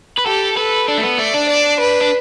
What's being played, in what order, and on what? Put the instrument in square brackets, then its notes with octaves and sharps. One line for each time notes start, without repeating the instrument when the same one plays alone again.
[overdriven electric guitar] B4
[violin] G4 [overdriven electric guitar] A4
[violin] A4 [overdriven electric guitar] B4
[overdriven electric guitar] D4 [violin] A4
[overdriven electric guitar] A3
B3
[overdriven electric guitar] A3 [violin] D5
[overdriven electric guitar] D4
[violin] D5
B4
[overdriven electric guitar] D4